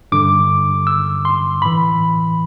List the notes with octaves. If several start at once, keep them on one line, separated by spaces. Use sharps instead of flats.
G2 D3 D6
E6
C6
A2 E3 B5